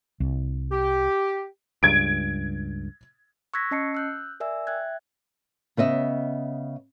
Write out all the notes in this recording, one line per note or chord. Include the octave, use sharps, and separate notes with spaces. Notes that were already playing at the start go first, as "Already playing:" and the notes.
C2
G4
C#2 G2 G#6 D7
C#6 E6 F#6 G#6 A#6 B6
C#4 D#5 A5 C7 C#7
E6 F#6 G6
A#4 D5 E5 G#5 E6
E5 G5 F#6 G#6
C#3 B3 D#5 E5